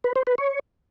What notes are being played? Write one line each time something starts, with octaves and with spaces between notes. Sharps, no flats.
B4
C5
B4
C#5